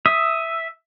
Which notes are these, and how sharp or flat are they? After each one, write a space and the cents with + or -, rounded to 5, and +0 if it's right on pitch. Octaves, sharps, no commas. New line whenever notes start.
E5 +0 D#6 +10